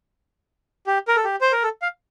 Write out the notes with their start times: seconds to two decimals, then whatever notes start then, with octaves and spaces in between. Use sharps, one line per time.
0.87 G4
1.08 A#4
1.16 A4
1.24 G4
1.41 C5
1.52 A#4
1.63 A4
1.82 F5